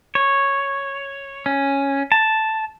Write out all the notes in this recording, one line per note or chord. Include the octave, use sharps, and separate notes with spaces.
C#5
C#4
A5